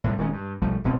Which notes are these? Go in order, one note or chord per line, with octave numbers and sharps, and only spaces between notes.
A2 C3 G3
D#1 D#3 G#3 C#4
G2
B1 F3 G3 A3
D1 C#2 B2 C4